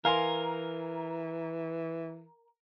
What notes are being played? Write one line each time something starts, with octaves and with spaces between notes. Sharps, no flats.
E3 A#4 F5 G#5 C6